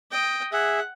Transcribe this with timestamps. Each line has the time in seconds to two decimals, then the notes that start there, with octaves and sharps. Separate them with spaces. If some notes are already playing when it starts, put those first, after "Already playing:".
0.11 D#5 G5
0.53 G#4 E5 F#5